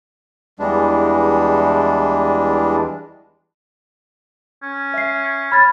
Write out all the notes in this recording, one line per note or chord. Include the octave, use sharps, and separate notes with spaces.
E2 E3 G3 G#3 D4
C#4
E5 C7
C#5 B5 F6 A6